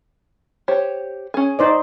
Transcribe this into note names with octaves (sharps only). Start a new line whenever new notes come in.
G4 C5 C#5
C#4 G#4
D#4 C5 D5